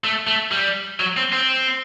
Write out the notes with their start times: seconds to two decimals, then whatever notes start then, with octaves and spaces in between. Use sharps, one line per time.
0.04 A3
0.27 A3
0.51 G3
1.00 F#3
1.17 C4
1.33 C4